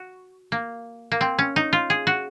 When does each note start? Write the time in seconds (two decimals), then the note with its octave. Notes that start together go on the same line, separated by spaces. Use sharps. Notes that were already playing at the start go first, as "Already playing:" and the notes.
Already playing: F#4
0.52 A#3
1.12 A#3
1.21 C4
1.39 C#4
1.56 D#4
1.73 F4
1.90 G#4
2.07 F#4